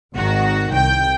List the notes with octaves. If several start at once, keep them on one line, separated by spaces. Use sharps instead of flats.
G#1 D#3 F#4
C2 G5